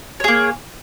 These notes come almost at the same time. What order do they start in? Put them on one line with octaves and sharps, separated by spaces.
C#5 G#4 A#3